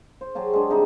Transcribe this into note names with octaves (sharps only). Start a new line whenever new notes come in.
C5
F#3 G4 G#4 A5
G#3 D4
C3 G3 D#4 G5